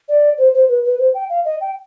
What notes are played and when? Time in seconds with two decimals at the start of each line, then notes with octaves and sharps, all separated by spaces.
0.09 D5
0.38 C5
0.54 C5
0.69 B4
0.84 B4
0.99 C5
1.14 G5
1.30 F5
1.45 D#5
1.61 G5